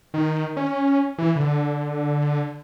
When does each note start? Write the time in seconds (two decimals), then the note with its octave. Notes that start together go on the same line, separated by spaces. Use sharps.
0.14 D#3
0.57 C#4
1.18 E3
1.36 D3